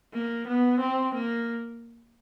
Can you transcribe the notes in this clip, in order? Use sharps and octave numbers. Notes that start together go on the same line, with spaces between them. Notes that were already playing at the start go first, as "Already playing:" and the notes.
A#3
B3
C4
A#3